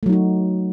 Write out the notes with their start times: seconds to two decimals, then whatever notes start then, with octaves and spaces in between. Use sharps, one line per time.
0.03 A3
0.06 F#3
0.09 D#4
0.13 F#4